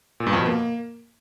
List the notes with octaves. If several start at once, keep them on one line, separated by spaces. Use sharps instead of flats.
A#2
G2
F2
B2
A#3